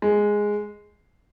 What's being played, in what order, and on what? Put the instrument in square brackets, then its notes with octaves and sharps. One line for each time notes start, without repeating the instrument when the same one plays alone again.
[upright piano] G#3